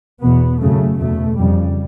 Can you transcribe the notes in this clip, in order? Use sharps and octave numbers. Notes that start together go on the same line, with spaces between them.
E2 B2 B3
F#2 C#3 A3
E2 B2 A3
F2 C#3 G3